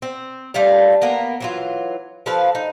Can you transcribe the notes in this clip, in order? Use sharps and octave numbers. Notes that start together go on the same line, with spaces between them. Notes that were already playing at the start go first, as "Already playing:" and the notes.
C4
G3 A3 F4 F5
A#3 B3 A#4
E3 F#3 F4
F3 A4 B4 F5
D#4